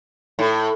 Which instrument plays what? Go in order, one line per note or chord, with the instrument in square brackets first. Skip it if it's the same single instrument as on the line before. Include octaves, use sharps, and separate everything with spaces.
[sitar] A2